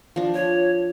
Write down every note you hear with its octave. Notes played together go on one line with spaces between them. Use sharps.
F3 D4
C#5